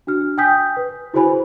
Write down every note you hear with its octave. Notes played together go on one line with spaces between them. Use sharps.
D4 F#4 F6
G5 G#5 D#6 G6 B6
B4
E4 F#4 G#4 C5 G#5 B5